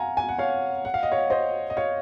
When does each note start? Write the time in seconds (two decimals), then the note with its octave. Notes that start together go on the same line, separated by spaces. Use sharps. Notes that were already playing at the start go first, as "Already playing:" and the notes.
Already playing: F5 F#5 G#5 A#5
0.17 G#5
0.28 F#5
0.38 C#5 F5
0.85 F#5
0.94 F5
1.03 D#5
1.12 C#5 F5
1.30 C5 D#5
1.70 D#5
1.77 C#5 F5